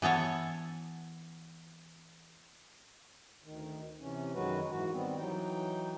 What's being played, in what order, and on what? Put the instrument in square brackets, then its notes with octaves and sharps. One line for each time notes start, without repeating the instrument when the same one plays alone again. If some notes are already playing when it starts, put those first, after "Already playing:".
[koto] E3 B3 A4 C#5
[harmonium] D2 D#3
C3 E3 C#4
F#2 D#3 F#3 G#3 F#4 B4
G#2 E3 F#4
D#3 G3 B3 C4
E3 F#3 D#4 G5